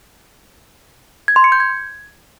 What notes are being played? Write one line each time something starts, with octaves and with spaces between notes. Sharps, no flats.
G#6
C6
C#7
G6
G#6